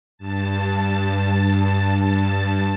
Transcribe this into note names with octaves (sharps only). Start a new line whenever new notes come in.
G2 A5